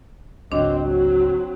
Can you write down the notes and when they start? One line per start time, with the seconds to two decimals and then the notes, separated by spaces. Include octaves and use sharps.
0.52 G#1 C#2 F#3 C4 D4 D#5
0.84 F#3 C4 F#4